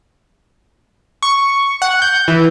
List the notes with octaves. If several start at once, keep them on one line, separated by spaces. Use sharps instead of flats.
C#6
F#5
G6
E3